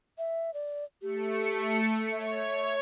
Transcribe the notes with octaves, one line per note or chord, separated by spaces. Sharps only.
E5
D5
A3 G4 C#7
C#5 E5